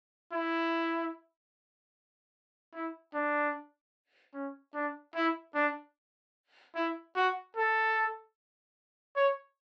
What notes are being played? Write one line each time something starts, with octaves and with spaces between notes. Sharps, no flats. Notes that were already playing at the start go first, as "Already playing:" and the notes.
E4
E4
D4
C#4
D4
E4
D4
E4
F#4
A4
C#5